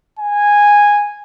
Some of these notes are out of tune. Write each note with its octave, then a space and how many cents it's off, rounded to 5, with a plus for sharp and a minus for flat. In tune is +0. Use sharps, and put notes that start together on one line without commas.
G#5 -10